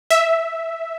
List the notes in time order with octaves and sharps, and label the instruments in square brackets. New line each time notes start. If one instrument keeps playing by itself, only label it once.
[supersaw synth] E5